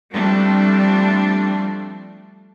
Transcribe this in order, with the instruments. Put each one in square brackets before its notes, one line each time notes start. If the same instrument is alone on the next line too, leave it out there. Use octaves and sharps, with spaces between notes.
[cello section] F3 G3 A3 C4 D4